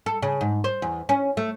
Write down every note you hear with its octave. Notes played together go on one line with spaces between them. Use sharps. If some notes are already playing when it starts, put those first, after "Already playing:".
A4
C#3
G#2
C5
E2
C#4
A3